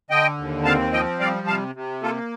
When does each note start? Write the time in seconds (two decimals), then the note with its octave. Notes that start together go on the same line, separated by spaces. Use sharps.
0.10 D3 D#5 G5
0.38 D#2
0.65 C4 F5 A5
0.93 F3 D#5 G5
1.20 G3 D5 F5
1.47 C3 F5 A5
1.75 C3
2.03 A#3 F4 A4